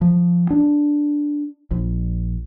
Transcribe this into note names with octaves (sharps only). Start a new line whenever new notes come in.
F3
D4
A#1